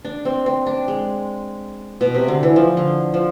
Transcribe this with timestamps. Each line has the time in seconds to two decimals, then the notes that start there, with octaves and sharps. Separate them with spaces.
0.05 D4
0.25 C4
0.46 C4
0.66 D4
0.88 G#3
2.01 B2
2.14 C3
2.28 D3
2.43 E3
2.56 F3
2.77 D3
3.14 F3